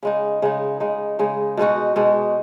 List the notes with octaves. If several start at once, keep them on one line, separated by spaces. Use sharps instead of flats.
C#3 G#3 D#4
C#3 G#3 D#4
C#3 G#3 D#4
C#3 G#3 D#4
B2 G#3 D#4 F#4
B2 G#3 D#4 F#4